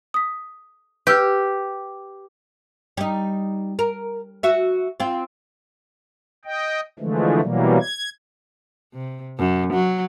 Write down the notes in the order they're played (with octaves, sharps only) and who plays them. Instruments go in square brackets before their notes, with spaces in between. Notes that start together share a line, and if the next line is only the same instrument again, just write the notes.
[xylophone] D#6 B6
[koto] G4 [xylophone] B4 E6 F6
[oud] G3 D#4
A#4
F#4 E5
C4 F4
[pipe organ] D#5 G5
D3 E3 F3 G#3 A3
B2 E3 F#3 G3 A#3
G#6
[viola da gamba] C3
F#2
F#3